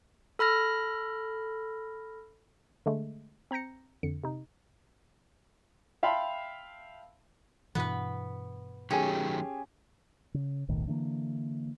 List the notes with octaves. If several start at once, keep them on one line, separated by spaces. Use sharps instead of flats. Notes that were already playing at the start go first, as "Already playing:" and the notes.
A4 B5 F6 A#6
D3 G#3 A3
C4 A#5 G6 A#6 C#7
F2 D3 C#7
C3 D#4
E5 F5 G5 A5 B5 C6
G2 B2 E3 B3 B4
D#3 F#3 A3 C#4 G4 G#4 G#5
C#3
D#1 B1 A2 D#3
D3 E3 G3 A#3